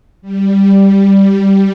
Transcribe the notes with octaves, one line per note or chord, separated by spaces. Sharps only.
G3